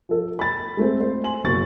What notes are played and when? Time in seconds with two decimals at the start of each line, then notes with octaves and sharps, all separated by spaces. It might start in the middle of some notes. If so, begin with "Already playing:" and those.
0.09 F3 A4
0.39 B5 A6
0.77 G#3 A3 C4
1.00 C5
1.24 G#5 C6 F#7
1.44 F#1 B2 C#6 A6